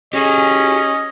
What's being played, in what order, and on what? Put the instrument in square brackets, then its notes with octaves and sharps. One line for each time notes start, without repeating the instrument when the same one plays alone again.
[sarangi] C#4 [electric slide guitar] G4 G#4 [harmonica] D#5